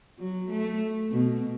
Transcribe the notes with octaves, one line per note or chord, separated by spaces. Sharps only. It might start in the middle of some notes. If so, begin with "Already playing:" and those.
F#3
A3
B2